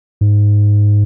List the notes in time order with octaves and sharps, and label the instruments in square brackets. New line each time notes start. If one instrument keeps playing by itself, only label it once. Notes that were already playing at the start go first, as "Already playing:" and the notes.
[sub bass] G#2